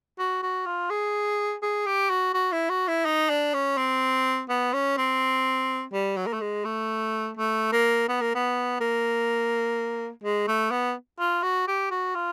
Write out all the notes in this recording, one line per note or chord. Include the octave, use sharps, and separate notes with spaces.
F#4
F#4
F4
G#4
G#4
G4
F#4
F#4
E4
F#4
E4
D#4
D4
C#4
C4
B3
C#4
C4
G3
F#3
A#3
A3
G#3
A3
A3
A#3
B3
A#3
B3
A#3
G#3
A3
B3
F4
F#4
G4
F#4
F4